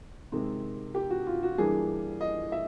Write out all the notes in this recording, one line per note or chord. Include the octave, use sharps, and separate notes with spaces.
C3 D#3 G#3 C4
G4
F#4
F4
F#4
G2 E3 G3 A#3 D4 G#4
D#5
E5